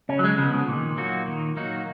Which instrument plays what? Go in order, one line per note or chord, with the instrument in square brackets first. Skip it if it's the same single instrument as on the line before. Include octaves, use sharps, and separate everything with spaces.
[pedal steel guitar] C#3 [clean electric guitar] C#4
[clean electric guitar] F#3
G#3
[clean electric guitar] C#3 [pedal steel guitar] F3 B3
[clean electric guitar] C#3
[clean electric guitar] A#2 [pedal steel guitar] D#3
[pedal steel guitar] F#3 A#3 D#4 F#4
D#3
F#3 A#3 D#4 F#4